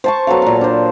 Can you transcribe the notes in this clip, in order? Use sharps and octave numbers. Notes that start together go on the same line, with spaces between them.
C5 A5 C#6
F#3 B3 A4 F5
A#2 C6
D4 C5